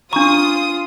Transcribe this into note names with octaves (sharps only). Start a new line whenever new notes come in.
D4 F4 A#5 C#6 D#6